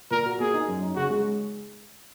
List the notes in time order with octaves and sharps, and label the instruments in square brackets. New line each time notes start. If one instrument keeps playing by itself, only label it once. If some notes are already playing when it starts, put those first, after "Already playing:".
[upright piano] A#2 [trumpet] A#4
[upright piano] F#4
[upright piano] A#3 [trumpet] G#4
[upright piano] D#4
F#2
D#4
[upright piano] C#3 [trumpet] F#4
[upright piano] G#3